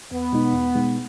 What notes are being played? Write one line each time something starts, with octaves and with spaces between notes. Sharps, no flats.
E2 B3
B2 G#3 D#4
E2
B2 G#3 D#4